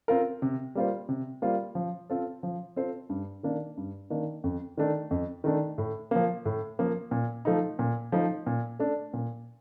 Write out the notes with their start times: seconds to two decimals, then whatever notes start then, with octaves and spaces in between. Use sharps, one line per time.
0.08 C4 F4 A#4
0.42 C3
0.75 G3 A#3 F4 C5
1.09 C3
1.42 G3 A#3 F4 C5
1.75 F3
2.10 C4 F4 A4 C5
2.43 F3
2.76 C4 F4 A4 C5
3.09 G2
3.43 D#3 A#3 D4
3.77 G2
4.10 D#3 A#3 D4
4.44 F2
4.77 D#3 A3 D4
5.11 F2
5.44 D#3 A3 D4
5.78 A2
6.11 F3 A#3
6.45 A2
6.79 F3 A#3
7.11 A#2
7.45 F3 A3 D#4
7.79 A#2
8.12 F3 A3 D#4
8.47 A#2
8.79 A3 D4
9.14 A#2